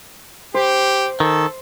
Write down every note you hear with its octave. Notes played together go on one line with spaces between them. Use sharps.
G4 C5
D#3 A4